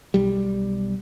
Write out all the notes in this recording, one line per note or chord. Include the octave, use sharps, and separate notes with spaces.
B1 G3